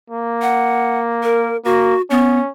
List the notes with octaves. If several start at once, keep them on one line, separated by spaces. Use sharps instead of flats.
A#3
F#5
A#4
A#3 F#4
B3 C#4